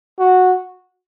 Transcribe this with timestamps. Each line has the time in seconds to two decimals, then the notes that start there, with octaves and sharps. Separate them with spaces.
0.20 F#4